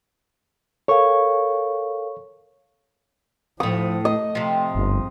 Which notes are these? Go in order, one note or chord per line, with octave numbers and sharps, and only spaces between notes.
A4 A#4 C#5 F5 C#6
D2 A2 F3 D#6
A3 D#5
C3 F3
G1 G#2